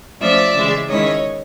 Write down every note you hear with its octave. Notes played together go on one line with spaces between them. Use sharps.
F3 A3 C#4 F4 D5 E5
C#3 E3 G#3
D#3 G#3 C#4 E4 C#5 D#5